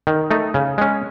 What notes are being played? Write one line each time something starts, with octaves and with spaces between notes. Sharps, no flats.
D#3
A3 D#4
C#3
G#3 C#4